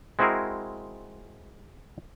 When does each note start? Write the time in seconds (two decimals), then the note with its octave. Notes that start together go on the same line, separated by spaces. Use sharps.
0.19 G#3 C4 E4 F#4 G#4 A#4